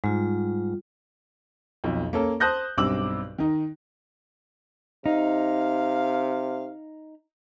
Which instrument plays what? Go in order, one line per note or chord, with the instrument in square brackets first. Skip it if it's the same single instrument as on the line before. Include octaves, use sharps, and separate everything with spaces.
[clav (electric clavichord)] G#2 [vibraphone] G3 F4
[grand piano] B1 F2
A#3 C#4 A4
C5 A5 D#6 F#6 G6 A#6
B1 G2 C4 D6 E6 F#7
D#3 D#4
[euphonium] C3 [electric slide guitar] D#4 [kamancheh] F5